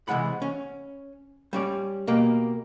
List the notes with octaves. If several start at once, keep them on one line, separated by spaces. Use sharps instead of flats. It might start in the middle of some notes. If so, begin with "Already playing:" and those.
C3 E3 G#3 F#5 B5
C#4
G3 C#4 D5
B2 A#3 G4